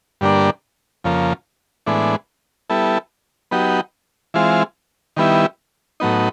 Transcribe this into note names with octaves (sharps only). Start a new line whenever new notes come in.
G2 D3 G3 A#3 D4
F2 C#3 F3 A#3
A2 E3 G#3 B3 D4
G3 B3 E4 A4
F#3 B3 D#4 G4
E3 G#3 C4 F4
D#3 G3 B3 E4
A2 F#3 B3 D#4